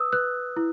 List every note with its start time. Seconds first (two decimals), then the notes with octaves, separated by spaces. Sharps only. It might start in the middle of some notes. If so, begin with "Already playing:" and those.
Already playing: B4 D#6 E6
0.13 B4 F#6
0.57 E4